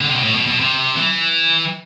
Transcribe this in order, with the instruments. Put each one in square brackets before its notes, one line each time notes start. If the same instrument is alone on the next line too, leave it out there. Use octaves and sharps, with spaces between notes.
[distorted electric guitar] D3
C3
B2
A2
B2
B2
C3
E3